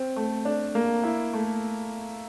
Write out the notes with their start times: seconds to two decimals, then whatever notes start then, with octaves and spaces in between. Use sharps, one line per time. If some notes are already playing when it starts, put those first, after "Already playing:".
Already playing: C4
0.16 A3
0.45 D4
0.75 A#3
1.04 E4
1.33 A3